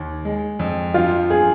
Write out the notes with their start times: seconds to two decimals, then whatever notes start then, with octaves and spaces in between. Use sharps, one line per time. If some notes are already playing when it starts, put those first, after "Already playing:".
Already playing: D#2
0.25 G#3
0.59 F2
0.94 F3 F4
1.30 G#4